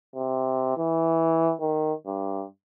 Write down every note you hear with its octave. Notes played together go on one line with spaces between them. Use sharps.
C3
E3
D#3
G2